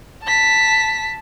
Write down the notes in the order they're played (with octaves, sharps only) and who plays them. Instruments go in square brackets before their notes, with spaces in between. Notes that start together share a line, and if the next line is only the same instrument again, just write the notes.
[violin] A5 B6